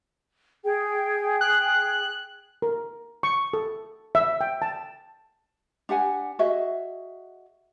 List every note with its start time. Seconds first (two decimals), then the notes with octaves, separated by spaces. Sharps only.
0.64 G#4 G5
1.41 F#6
2.62 A#4
3.23 C#6
3.53 A4
4.15 E5
4.41 G5
4.62 A5
5.89 D4 G4 F#5 G#5
6.39 F#4 G#4 D#5 E5